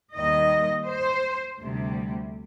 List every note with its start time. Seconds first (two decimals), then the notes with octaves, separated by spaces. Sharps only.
0.15 D#2 D#3 G3 D#5
0.87 C5
1.60 D2 C3 G3